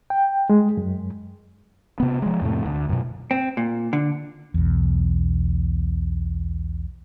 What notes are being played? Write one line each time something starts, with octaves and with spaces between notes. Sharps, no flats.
G5
G#3
F#2
C3 B3
F3 G#3
F2 A2 C3 A3
D2
F#2 B2
C4
A#2
D3
B1 E2